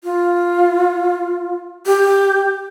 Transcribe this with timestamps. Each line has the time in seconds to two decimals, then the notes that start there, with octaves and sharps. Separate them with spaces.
0.04 F4
1.87 G4